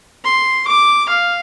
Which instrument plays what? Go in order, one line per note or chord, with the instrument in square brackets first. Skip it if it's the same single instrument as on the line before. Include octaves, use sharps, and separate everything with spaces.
[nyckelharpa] C6
D6
F5